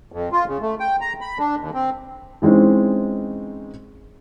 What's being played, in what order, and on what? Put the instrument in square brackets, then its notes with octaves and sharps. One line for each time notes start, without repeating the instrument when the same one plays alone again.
[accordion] F2
F4
C#3
A3
G5
A#5
B5
D4
D#2
C4
[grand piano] E3 G#3 C4 C#4 D#4